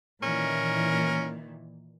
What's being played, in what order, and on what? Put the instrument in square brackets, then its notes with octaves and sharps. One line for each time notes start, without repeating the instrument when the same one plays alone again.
[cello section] A#2 D#3 E3 [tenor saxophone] C#4 [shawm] A#4